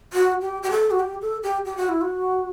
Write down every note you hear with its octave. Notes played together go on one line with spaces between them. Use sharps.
F#4
G4
G4
A4
F#4
G4
A4
G4
G4
F#4
E4
F#4